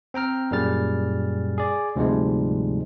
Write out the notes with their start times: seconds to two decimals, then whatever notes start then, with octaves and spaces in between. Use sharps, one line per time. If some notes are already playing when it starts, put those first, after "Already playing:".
0.14 C4 G5 A#5 F6
0.51 F#2 A#2 G3 G#4 F6 A6
1.58 G#4 D5
1.96 D2 G#2 C3 F3 G3 G#3